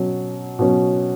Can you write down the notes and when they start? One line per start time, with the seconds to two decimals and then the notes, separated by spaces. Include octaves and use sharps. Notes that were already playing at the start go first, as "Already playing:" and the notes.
Already playing: B2 F#3 C#4
0.59 B2 F#3 C#4